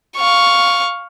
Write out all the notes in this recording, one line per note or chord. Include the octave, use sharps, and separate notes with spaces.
F5 C#6